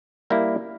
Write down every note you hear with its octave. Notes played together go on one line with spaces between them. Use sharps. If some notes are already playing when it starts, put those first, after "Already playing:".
G3 A#3 E4